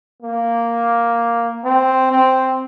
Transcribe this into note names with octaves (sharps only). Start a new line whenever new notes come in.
A#3
C4
C4